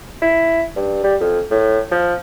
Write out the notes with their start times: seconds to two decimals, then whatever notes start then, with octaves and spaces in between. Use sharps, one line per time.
0.22 E4
0.76 G2
1.04 G3
1.20 F2
1.51 A2
1.91 F3